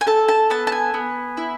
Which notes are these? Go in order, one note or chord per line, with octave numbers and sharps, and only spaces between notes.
G#5
A4 A5
A5
B3 A5
A5
G#5
B3
E4